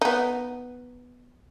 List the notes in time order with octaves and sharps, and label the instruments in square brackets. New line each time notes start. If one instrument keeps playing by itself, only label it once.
[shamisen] B3 D#4